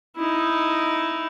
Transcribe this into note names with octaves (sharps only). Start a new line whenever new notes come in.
D#4 E4